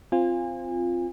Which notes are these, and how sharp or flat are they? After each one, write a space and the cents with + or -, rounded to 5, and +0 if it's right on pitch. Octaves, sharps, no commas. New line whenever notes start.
C4 +0 F4 +0 G#5 -30